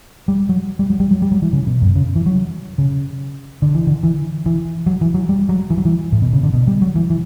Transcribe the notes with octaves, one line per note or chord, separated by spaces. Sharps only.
G3
F#3
G3
F#3
G3
F#3
G3
F#3
E3
C#3
B2
F#2
C#3
E3
F#3
C#3
D3
E3
D3
E3
E3
F#3
E3
F#3
G3
F#3
E3
F#3
E3
A2
B2
C#3
D3
B2
G3
F#3
E3
E3